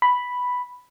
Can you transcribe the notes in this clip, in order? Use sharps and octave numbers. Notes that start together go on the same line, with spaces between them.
B5